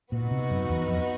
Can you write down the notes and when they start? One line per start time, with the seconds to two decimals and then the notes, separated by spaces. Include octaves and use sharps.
0.12 A#2 B3 D#4 F#4
0.31 C3
0.51 F#2
0.69 E2
0.88 F2